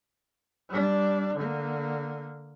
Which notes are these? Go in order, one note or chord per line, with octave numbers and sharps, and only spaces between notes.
G3 D4
D3 A#3